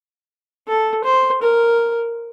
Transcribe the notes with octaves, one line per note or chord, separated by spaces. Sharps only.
A4
C5
A#4